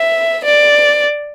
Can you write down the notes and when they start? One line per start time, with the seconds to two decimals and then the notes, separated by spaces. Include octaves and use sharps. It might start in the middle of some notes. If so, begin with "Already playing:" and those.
Already playing: E5
0.45 D5